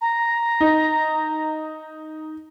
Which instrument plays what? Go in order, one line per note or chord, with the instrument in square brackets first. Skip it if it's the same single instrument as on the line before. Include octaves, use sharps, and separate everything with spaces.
[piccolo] A#5
[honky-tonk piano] D#4